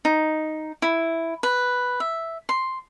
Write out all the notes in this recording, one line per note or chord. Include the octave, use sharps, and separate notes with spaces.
D#4
E4
B4
E5
C6